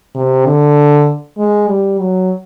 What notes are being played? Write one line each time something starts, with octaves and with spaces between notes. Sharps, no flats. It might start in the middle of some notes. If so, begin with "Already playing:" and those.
C3
D3
G#3
G3
F#3